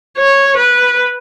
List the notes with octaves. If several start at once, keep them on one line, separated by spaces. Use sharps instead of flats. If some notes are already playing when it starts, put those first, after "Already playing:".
C#5
B4